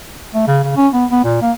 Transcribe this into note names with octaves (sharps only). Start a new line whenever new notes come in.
A3
C#3
C#3
C#4
B3
B3
A#2
A#3